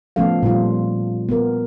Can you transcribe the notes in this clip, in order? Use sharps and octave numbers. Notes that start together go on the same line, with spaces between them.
F3 A3 B3 C#4 A4 F5
A#2 G3 F4
B3 A#4